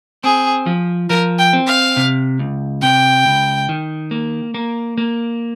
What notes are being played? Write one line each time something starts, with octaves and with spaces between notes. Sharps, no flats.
C4 G#4
F3
F3 A#4
G5
C4
F5
C3
C#2
C3 G5
C#2
D#3
A#3
A#3
A#3